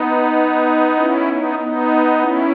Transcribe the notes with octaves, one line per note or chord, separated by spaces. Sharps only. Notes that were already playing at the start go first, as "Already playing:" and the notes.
Already playing: B3 D#4
C#4 E4
B3 D#4
B3 D#4
C#4 E4